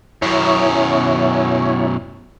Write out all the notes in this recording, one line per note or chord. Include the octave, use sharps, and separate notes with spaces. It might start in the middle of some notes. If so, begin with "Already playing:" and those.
F#2 B2 E4 C#5